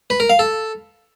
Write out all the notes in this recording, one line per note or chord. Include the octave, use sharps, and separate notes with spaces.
B4
A#4
F5
A4